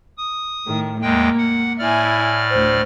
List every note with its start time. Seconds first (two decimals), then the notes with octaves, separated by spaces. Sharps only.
0.18 D#6
0.66 A2 D#3
1.02 E2 G#3 A#3 G5
1.37 F#5
1.79 A2 E4 D5 G#5 F6
2.49 D2 C5